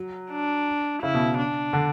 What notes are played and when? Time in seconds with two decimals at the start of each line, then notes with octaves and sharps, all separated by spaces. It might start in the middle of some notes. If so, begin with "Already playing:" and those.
Already playing: F#3
0.32 D4
1.02 C#3 E4
1.14 B2
1.38 D4
1.73 D3